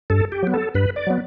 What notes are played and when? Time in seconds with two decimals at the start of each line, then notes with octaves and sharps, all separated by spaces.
0.10 G2 A4
0.32 G4
0.43 F#3 B3
0.54 A4
0.75 G2 B4
0.96 D5
1.07 F#3 B3